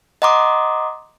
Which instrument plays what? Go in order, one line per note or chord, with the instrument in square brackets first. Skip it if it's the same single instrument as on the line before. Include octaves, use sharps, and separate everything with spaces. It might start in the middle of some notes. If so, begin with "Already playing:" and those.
[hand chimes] D#5 F#5 A#5 C6 D6 D#6